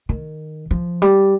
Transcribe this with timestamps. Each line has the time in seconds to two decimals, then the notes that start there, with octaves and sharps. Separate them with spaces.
0.09 D#3
0.71 F3
1.02 G3